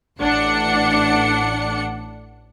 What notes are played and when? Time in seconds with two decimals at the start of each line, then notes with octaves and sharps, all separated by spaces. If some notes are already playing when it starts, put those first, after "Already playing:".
0.21 A1 D4 F#5 C#7